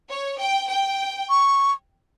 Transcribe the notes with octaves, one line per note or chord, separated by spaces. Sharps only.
C#5
G5
G5
C#6